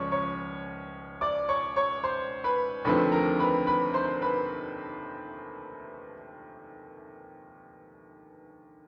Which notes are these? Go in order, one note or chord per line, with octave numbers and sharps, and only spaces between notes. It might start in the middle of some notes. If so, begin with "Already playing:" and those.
Already playing: C#2 C#3 F3 C#5 D5 C#6
C#5 C#6
D5 D6
C#5 C#6
C#5 C#6
C5 C6
B4 B5
D#2 D3 F3 A3 C4 B4 B5
A#4 A#5
B4 B5
B4 B5
C5 C6
B4 B5